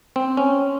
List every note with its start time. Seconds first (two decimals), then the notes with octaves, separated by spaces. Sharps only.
0.16 C4
0.37 C#4